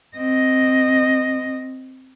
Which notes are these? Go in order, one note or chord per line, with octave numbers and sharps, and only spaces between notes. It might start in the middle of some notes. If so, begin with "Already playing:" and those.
C4 D#5